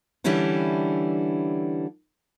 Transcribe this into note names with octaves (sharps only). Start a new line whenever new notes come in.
D3 E3 G3 C#4 D4 E4